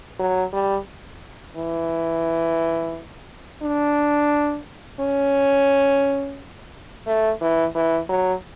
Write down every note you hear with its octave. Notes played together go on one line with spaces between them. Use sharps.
F#3
G3
E3
D4
C#4
A3
E3
E3
F#3